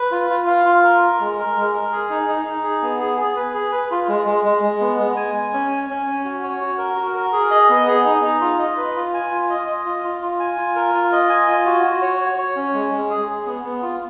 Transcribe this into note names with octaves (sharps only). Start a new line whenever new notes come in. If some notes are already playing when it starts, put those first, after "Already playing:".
Already playing: B4
F4
F4
F5
F4
A#4
A#4
G#3
A#4
G#3
A#4
G#4
D#4
D#4
D#4
G#4
B3
G#4
G#4
B4
G#4
B4
F4
G#3
G#3
G#3
G#3
B3
G#3
G#5
G#5
C#4
G#5
C#4
C#4
F#4
C#5
F#4
A#4
F#4
A#4
G#4
D#5
B3
G#4
D#4
D#4
F4
D#5
B4
F4
G#5
F4
D#5
D#5
F4
F4
F4
G#5
F4
A#4
F4
D#5
G#5
F4
F#4
F#4
C#5
C#5
C#5
C#4
G#3
G#3
G#4
G#4
B3
B3
F4